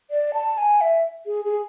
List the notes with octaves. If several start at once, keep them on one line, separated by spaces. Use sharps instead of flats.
D5
A5
G#5
E5
G#4
G#4